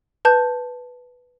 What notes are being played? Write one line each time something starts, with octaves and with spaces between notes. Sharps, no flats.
B4 A5 G6